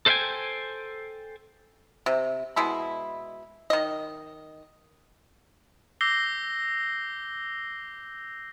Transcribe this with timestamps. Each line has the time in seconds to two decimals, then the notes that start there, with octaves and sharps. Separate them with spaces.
0.06 A4 C5 E5 F5 G5 G#5
2.06 C3
2.56 B2 G#3 E4 B5
3.70 D#3 D#5
6.01 D6 E6 G6 A#6 C7 G7